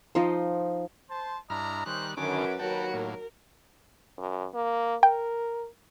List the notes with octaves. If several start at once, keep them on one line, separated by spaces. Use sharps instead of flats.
F3 D#4 C5
C5 A5
G2 D4 E4 D#5 A#5 F6
D#3 G3 C#4 D#4 C5 F#6
F#2 D3 D#3 C#4 B4 D6
D#2 D#3 F#3 F#4 A#4 G5 A5
A2 A#3 A#4
F#2
A#3
A#4 G5